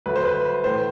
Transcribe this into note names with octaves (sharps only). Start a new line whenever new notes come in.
D2 D3 F#3 A3 B4
C5
B4
A2 E3 A3 C5